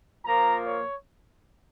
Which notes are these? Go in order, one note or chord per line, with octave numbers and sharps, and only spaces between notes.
A#2 F3 A#3 A#5
C#5